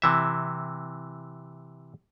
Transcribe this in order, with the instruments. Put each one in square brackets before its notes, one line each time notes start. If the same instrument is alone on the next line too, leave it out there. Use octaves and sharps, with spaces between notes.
[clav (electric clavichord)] C3 E3 E5